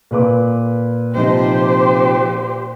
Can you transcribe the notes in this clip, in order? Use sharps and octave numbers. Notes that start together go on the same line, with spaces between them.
A#2 B4 D6
C3 F3 D#4 G4 C5